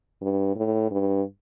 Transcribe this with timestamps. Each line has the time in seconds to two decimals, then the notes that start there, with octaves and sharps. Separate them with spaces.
0.21 G2
0.56 A2
0.91 G2